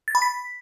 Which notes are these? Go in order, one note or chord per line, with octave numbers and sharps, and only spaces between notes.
A6
B5
B6